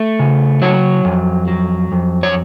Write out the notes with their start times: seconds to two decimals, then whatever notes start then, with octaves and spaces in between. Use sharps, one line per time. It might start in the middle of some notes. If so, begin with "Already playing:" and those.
Already playing: A3
0.19 C#3
0.62 F#3 C#5
1.05 F2
1.48 F#3
1.92 F2
2.23 C#5